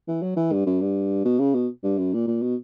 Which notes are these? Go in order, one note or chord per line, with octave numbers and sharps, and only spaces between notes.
E3
F#3
E3
G2
F#2
G2
B2
C#3
B2
G2
F#2
A#2
A#2
B2